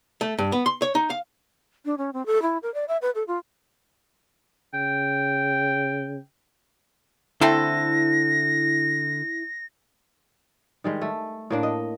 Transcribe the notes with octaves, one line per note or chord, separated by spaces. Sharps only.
A3
G2
B3
C6
C#5
D#4
F5
D4
C#4
C4
A4
E4
A#4
D5
E5
B4
A4
F4
C#3 G5
D3 A3 C4 E4 A4 A#6
D#3 G3 G#3
A3
A2 A#3 D4
D#5